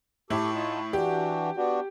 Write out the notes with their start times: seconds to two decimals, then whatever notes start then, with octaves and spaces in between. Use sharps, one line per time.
0.30 A2 E4 G4 A4
0.54 D#4 F4 A5
0.93 E3 D4 F#4 G4
1.57 B3 D4 F#4